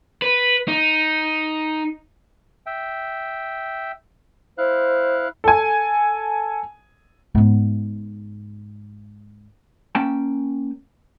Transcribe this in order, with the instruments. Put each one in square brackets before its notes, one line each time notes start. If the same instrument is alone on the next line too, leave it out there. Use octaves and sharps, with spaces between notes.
[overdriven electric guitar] B4
D#4
[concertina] E5 G5
[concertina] E4 F5 F#6 [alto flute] C5
[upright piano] A4 G#5
[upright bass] G#2 B3
[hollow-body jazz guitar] A#3 C#4 G5 A5